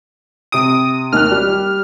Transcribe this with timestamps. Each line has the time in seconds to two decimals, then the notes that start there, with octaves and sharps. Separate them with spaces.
0.52 C3 D#6 D7
1.12 D#2 F6 F#6
1.31 G3